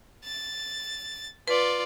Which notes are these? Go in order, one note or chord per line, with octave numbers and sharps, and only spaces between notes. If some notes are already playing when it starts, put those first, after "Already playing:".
A6
F4 B4 D5